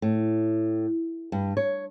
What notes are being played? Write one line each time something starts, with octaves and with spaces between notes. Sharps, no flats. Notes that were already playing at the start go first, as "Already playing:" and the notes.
A2
G2
C#5